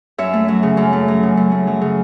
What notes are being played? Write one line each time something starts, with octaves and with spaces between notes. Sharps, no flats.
F#2 C#5 E5
A3
F#3
C#3
F#2
A3
F#3
C#3
F#2
A3
F#3
C#3